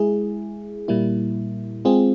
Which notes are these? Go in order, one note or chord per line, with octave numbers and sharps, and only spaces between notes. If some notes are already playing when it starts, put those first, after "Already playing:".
Already playing: G#3 E4 G#4
A#2 G3 A#3 E4
G#3 C4 F4 G#4